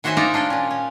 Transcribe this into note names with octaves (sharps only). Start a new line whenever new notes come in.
D#3 F#4 C5 C#5 E5 G#5
D#4 F4 D5 A#5
D4 F4 F#5 G5
A#2 C#4
C#4